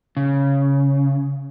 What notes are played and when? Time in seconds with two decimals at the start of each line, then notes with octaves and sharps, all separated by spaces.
0.17 C#3